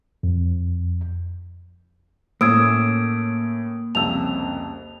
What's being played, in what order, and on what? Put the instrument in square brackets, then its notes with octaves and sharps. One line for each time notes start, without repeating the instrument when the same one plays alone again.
[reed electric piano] F2
[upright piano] A2 C#4 [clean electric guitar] A#3 [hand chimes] D#6 E6 G#6 [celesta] D7
[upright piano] C2 F2 C#3 [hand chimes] A5 E6 [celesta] F7